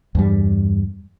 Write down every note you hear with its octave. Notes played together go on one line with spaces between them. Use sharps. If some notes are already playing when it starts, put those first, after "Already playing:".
E2 G2 G3